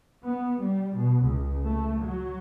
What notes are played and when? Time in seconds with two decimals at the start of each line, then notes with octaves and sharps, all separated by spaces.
0.24 B3
0.59 G3
0.96 B2
1.24 C#2
1.66 A3
2.02 F#3